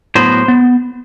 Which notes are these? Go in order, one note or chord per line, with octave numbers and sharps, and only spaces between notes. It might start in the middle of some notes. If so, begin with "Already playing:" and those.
A2 F#3 B3 C5
B3